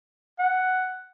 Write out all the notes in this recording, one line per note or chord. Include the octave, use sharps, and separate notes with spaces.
F#5